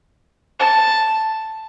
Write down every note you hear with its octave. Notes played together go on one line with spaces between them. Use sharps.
A5